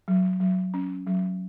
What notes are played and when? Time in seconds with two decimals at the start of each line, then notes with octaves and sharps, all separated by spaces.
0.08 F#3
0.40 F#3
0.74 C#4
1.06 F#3